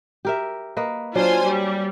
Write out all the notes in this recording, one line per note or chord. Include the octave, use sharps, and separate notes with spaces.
G4 A#4 E5
A#3 B4 D#5
F#3 D4 F4 C5 G#5
G3